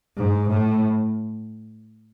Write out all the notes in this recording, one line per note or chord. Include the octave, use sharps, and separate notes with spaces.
G#2
A2